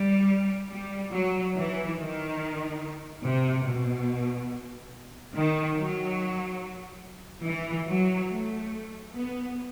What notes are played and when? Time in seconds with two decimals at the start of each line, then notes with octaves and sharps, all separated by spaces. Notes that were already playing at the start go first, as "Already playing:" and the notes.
Already playing: G3
0.70 G3
1.12 F#3
1.55 E3
1.97 D#3
3.24 C3
3.65 B2
5.34 D#3
5.76 F#3
7.45 E3
7.88 F#3
8.30 A3
9.14 B3